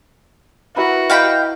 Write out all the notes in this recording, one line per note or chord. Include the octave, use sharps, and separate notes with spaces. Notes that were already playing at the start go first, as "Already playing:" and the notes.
E4 F#4 A#4 B4
D#5 F5 G5 B5 G6